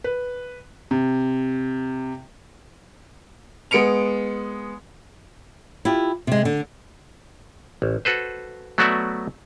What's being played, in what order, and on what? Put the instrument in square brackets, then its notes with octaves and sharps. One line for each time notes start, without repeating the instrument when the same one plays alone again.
[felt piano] B4
C3
[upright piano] G#3 B3 C#7 D7 F7
[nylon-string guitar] E4 F4 G4
C3 G#3
D3
[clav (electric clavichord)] A1
F#4 A4 B4 C5
F#3 A3 B3 F#4 D5 E5